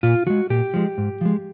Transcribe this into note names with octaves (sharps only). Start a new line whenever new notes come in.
A#2 F4
F3 G#3 F#4
A#2 G4
F3 G#3
G#2
F3 G#3